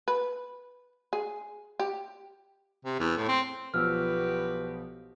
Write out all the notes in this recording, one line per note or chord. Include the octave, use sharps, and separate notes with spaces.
B4
G#4
G4
C3
E2
A2
C4
B1 F3 B3 F#4 G4 B4 E6 F6